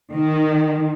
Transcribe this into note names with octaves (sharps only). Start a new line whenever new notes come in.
D#3